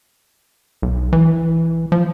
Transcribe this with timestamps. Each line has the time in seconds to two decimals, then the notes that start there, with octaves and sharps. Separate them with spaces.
0.82 B1
1.13 E3
1.92 F3